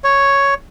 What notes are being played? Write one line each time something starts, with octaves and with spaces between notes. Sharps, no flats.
C#5